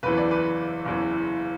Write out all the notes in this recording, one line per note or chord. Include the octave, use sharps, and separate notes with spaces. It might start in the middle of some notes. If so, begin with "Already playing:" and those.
F#1 E2 E3 B4
D5
B4
F#1 E2 E3